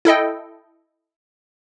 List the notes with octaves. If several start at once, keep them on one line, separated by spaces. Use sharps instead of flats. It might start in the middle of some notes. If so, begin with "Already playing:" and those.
E4 A4 D#5 G5